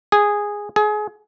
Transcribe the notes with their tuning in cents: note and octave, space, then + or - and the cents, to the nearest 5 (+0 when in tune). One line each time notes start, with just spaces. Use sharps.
G#4 -10
G#4 +25